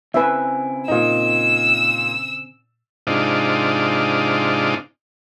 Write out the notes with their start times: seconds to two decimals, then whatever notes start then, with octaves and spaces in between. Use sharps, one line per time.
0.14 C#3 C4 E4 B4 E5 G#5
0.88 A#2 D#4 E6
3.07 G#2 C3 D4 D#4 F4